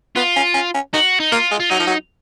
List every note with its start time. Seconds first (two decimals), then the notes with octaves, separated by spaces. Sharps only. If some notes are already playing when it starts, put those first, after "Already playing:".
0.16 B3 F4
0.36 C#4
0.54 C#4
0.74 C#4
0.93 D#4 F#4
1.20 D#4
1.32 A#3 F4
1.51 G#3
1.60 F4
1.70 F#3 D#4
1.79 F3
1.87 F#3